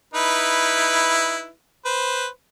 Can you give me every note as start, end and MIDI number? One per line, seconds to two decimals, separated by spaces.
0.14 1.49 63
0.14 1.49 64
0.14 1.49 71
1.85 2.27 71
1.85 2.27 72